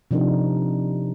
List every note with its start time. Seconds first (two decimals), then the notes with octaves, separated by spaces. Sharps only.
0.11 C3 F3 D4 D#4 A#4